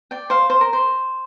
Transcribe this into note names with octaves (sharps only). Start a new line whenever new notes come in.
D5 G5
C5 F5
C5
A#4
C5